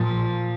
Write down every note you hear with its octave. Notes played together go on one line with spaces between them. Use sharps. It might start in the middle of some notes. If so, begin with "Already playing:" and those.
Already playing: A#2 F3